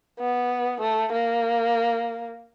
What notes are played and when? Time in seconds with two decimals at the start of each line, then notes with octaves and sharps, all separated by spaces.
0.20 B3
0.81 A3
1.13 A#3